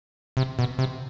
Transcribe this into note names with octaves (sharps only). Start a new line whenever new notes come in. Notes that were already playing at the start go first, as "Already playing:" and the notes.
C3
B2
C3